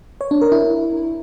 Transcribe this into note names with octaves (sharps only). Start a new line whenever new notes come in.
C#5
D4
A#4
E4